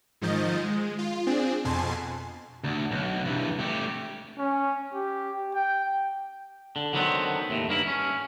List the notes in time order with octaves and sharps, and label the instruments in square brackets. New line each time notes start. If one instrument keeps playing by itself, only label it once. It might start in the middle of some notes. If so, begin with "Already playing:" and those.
[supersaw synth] G#2 D#3 F3 D#5 G6 A6
G#3
F4
C4 D4 G#4
F2 B2 G#5 A5 C6
[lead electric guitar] D2
B1
G2 E3
A3 G4
[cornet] C#4
G4
G5
[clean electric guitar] D3
D3 D#3 F#3 B3 C4
D#2 A2
G2 A#3 E4
C#4